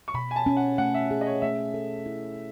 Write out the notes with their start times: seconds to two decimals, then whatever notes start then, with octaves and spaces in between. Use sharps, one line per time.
0.08 C#6
0.14 B2 B5
0.31 G#5
0.36 A5
0.46 C#4
0.57 F#5
0.78 A3 F#5
0.94 E5
1.11 G#4
1.21 D#5
1.27 C#5
1.42 A3 E5
1.74 A4
2.06 E4